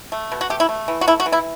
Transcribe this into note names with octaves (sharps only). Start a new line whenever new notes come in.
A3
B2
F#4
A3 G4
E4
A3
E3
F#4
A3 E4
F#4
E3
E4